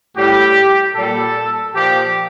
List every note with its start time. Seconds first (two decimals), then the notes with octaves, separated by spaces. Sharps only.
0.16 A2 G3 G4
0.94 A#2 G3 A4
1.73 A#2 F3 G4